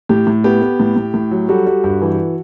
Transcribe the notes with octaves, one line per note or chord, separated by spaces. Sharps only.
A2 G4
A2
B3 G4
B3
A2
A2
A2
F#3
G3 F#4 A4
G3
G2
E3